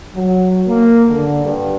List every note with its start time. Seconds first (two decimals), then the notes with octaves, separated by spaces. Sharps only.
0.15 F#3
0.68 A#3
1.09 D3
1.45 G2